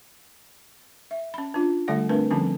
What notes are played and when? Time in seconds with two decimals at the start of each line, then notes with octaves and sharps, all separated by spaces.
1.11 E5
1.34 C#4 B5
1.54 D4 F4
1.88 D3 G3 A3 D5 F#5
2.09 A3 C4 D4 A#4 B4
2.31 D3 F3 G3 C4 C#4 D#4